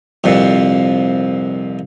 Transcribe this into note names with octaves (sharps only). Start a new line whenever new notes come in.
C2 F2 A#2